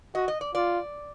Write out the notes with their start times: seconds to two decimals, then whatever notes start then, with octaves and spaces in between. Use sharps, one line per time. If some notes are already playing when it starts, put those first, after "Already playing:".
0.15 F#4 D#5
0.28 D#5
0.41 D5
0.55 F4 D5